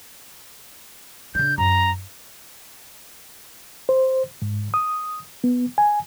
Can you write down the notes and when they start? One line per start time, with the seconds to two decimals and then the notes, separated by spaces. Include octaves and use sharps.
1.35 C#3 D4 G6
1.58 F#2 A#5
3.89 C5
4.42 G#2
4.74 D#6
5.44 B3
5.78 G#5